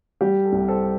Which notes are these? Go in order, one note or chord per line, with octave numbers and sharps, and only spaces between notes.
G3 G4
A4
C2
A4 C5